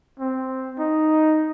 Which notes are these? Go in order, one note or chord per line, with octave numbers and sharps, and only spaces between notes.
C4
D#4